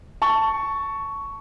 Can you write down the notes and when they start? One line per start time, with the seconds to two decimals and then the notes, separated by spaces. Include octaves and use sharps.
0.22 A5 C#6